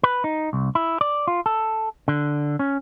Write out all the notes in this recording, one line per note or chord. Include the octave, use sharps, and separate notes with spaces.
B4
D#4
C2
E4
D5
F4
A4
D3
C#4